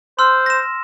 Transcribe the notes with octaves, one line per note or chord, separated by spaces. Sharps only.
C5 C6 E6 F6
A#6 E7